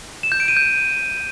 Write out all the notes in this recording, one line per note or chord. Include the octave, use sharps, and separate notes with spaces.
E7
G6
D7
D#7
G6